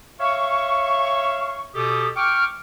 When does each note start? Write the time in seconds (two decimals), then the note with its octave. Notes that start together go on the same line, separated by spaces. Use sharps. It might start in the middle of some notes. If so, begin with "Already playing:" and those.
0.20 C#5 E5 F5 C#6
1.75 B2 G4 A4 D#6
2.16 G5 C#6 D6 F6